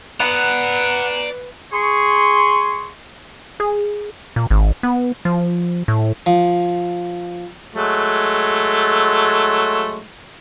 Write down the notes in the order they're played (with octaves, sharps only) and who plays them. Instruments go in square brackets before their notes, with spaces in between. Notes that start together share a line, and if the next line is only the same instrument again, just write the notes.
[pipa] B3 [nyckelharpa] B4 [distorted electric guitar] D5 A#5 [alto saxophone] F#5
[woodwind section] G#4 C6 C#6
[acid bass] G#4
A#2
G#1
B3
F3
A2
[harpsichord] F3
[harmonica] F#3 G#3 A3